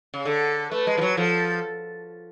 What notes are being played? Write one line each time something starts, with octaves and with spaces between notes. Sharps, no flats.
C#3
D3 A4
A3 B4
G#3
F3
F#3
F3 A4